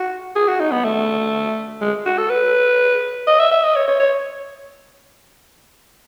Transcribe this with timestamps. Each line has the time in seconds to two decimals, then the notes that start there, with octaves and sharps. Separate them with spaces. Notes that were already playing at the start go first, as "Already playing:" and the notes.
Already playing: F#4
0.36 G#4
0.48 F#4
0.60 D#4
0.72 B3
0.85 A3
1.81 G#3
2.06 F#4
2.18 A4
2.30 B4
3.27 D#5
3.39 E5
3.51 E5
3.64 D#5
3.76 C#5
3.88 C#5
4.00 C#5